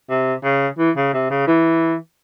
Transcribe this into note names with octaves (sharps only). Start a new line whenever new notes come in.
C3
C#3
E3
C#3
C3
C#3
E3